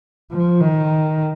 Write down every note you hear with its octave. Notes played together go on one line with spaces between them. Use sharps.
F3
D#3